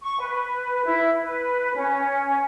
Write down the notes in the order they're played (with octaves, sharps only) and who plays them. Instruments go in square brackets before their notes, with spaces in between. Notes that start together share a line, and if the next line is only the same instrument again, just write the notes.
[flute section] C#6
B4
E4
B4
C#4